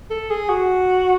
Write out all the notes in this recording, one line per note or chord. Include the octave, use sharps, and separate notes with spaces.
A4
G#4
F#4